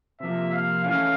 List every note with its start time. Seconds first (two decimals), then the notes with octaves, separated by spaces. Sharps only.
0.20 C3 F3 A#3 E5
0.52 F5
0.84 E3 A3 C#4 E4 F5